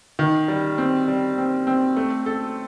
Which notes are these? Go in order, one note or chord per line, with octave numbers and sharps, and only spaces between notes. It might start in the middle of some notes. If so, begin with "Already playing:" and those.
D#3
G3
C4
G3
C4
C4
A3
A4